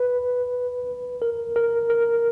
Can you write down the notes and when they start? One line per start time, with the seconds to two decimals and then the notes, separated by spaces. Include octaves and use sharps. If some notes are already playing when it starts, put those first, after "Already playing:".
Already playing: B4
1.22 A#4
1.56 A#4
1.90 A#4